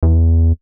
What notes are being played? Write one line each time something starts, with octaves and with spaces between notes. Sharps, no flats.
E2